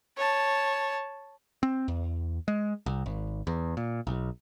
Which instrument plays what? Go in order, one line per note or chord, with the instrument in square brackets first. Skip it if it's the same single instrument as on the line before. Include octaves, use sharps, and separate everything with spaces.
[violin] C#5 A5
[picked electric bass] C4
E2
G#3
C2
G#1
E2
A#2
B1